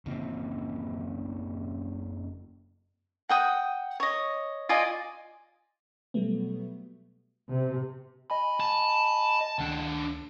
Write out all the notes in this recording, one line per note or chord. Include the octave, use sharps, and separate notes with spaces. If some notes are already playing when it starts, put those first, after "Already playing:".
F#1 C#3 A#3 C4
F#5 G5 D#6
C#5 D#5
F4 D5 D#5 G#5
B2 F#3 G3 A3 B3
C3
D#5 G#5 B5
A5
D2 D#3 D4